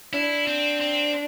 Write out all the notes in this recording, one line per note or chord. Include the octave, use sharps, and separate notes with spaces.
D4 E4
C4
C4